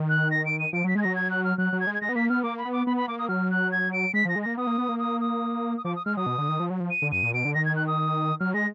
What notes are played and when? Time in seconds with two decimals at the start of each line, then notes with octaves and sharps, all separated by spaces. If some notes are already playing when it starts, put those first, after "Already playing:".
Already playing: D#3
0.09 F#6
0.31 A#6
0.46 D7
0.59 D#7
0.73 F3 D7
0.84 F#3 B6
0.95 G#3 G#6
1.02 F#3 A#6
1.15 G#6
1.30 F#6
1.44 F6
1.58 F#3 F#6
1.73 F#3
1.80 G#6
1.87 G#3
1.94 G#6
2.01 G#3 A#6
2.09 B3
2.16 A#3 B6
2.29 B3 F6
2.43 A#3 D6
2.58 B5
2.65 B3
2.72 D6
2.87 B3 B5
2.97 B5
3.08 A#3 D6
3.19 D#6
3.29 F#3 F6
3.51 F#6
3.72 G#6
3.93 D7
4.14 G#3 B6
4.25 F3 A#6
4.36 G#3
4.43 A#3 A#6
4.57 B3 D#6
4.67 A#3
4.78 B3
4.89 A#3
4.99 D#6
5.21 D#6
5.77 D#6
5.85 F3 D6
5.96 D#6
6.06 G#3 F6
6.17 F#3 D#6
6.27 B2
6.38 D3
6.49 D#3
6.60 F3
6.70 F#3
6.80 F3
6.90 D#7
7.02 D3
7.12 F#2 D#7
7.23 A#2
7.34 B2 D7
7.45 D3
7.54 D#3 A#6
7.65 G#6
7.76 F#6
7.87 D#6
8.40 F#3 F6
8.54 G#3 A#6